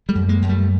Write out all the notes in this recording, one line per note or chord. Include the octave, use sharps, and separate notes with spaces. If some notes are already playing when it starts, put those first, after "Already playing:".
G3 A3
F#2
G#3 A#3
F#2
G3 A3